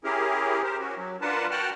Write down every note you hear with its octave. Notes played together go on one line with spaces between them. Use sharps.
C#4 E4 G4 G#4 A#4
G4 A#4 C5
C#4 F#4
F#3
D4 F4 A#4 B4 F#5 A5
F#4 F#5 G5 A5 F6 F#6